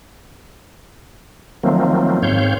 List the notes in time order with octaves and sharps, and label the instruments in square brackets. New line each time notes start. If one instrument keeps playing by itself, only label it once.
[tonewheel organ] D#3 F3 F#3 A3 A#3 C4
G#2 C4 C#5 F5 G6